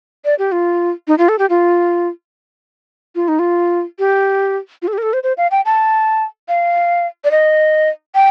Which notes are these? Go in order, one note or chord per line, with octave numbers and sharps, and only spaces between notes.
D5
G4
F4
D#4
F4
A4
G4
F4
F4
D#4
F4
G4
F4
A4
G4
A#4
A4
C5
C5
F5
G5
A5
F5
D5
D#5
G5